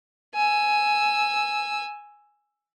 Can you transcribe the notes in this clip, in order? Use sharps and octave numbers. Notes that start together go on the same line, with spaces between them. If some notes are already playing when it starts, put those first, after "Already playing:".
G#5 E6